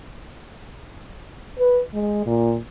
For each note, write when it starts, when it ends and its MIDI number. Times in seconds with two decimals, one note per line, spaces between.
1.59 1.80 71
1.94 2.26 56
2.26 2.58 46